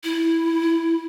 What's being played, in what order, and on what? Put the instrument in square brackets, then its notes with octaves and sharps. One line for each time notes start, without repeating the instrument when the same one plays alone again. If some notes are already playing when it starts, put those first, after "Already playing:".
[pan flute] E4